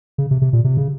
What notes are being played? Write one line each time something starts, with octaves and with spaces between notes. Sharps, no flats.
C#3
C3
C3
A#2
C3
C#3